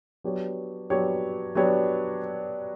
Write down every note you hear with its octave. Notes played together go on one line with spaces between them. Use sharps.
F#3 B3 D4 G4 C#5
F#3 B3 D4 G4 C#5
F#3 B3 D4 G4 C#5